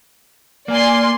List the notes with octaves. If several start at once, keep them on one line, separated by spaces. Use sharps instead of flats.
A#3 D5 G#5 C6